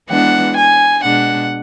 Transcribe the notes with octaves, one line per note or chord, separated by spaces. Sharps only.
E3 G#3 B3 D4 F#5
G#5
B2 G#3 D4 F#5